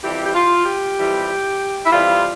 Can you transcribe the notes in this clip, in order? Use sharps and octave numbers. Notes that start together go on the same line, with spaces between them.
F2 E3 G3 G4
G4
F4
G4
F2 E3 G3
E4
F2 E3 G3 F4